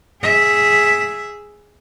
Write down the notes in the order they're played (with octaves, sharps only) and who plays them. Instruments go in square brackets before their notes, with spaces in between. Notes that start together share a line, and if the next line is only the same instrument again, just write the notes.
[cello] G#4 E5